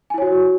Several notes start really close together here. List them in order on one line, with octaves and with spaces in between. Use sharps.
G#5 E4 C#5 F#4